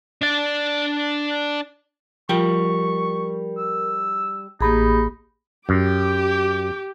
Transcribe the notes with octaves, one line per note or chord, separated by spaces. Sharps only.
D4 D5
F3 G3 A#4 G5 C#6
E6
A1 A#3 D#4 G4 G#4 B5
F#2 G4 D6